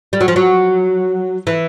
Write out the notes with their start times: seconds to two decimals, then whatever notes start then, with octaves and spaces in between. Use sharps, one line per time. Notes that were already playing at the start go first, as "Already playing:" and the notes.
0.13 G3
0.21 F#3
0.28 F3
0.36 F#3
1.47 E3